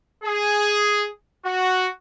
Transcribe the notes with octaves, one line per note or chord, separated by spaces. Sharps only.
G#4
F#4